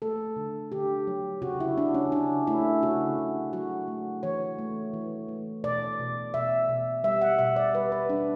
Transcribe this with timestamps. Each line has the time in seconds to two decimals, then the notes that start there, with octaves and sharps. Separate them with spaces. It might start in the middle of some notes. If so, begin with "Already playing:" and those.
0.02 A3 A4
0.36 D3
0.72 D3 G4
1.07 F#3
1.42 C#3 F#4
1.60 E4
1.77 C#3 D4
1.94 C#4
2.12 C#3 D4
2.47 A3 E4
2.82 C#3 F#4
3.18 C#3
3.53 F#3 F#4
3.88 A3
4.23 E3 C#5
4.59 A3
4.94 E3
5.28 A3
5.64 B2 D5
5.99 B2
6.34 B2 E5
6.69 B2
7.04 G3 E5
7.21 F#5
7.39 B2 E5
7.56 D5
7.74 G3 B4
7.92 B4
8.10 G3 D4